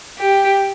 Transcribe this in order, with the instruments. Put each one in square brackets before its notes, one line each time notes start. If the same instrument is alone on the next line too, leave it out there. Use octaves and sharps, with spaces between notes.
[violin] G4